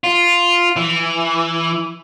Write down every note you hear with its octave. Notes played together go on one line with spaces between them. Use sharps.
F4
E3